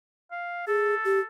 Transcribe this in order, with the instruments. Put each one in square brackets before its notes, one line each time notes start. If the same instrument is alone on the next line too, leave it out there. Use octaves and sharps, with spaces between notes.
[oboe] F5
[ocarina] G#4 [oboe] A4
[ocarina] G4